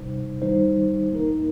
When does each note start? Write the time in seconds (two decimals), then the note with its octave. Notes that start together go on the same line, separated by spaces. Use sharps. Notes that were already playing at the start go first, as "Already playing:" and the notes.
Already playing: C3 G3 D#4 C5
0.42 D#3 G3 D#4 C5
1.12 A#3 D#4 A#4